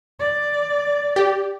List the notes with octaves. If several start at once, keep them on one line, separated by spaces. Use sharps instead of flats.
D5
G4